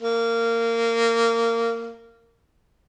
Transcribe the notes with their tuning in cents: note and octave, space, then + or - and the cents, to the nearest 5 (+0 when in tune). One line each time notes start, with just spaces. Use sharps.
A#3 -20